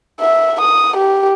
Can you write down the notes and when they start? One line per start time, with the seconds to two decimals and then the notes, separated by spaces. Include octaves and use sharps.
0.21 E5
0.61 D#6
0.97 G4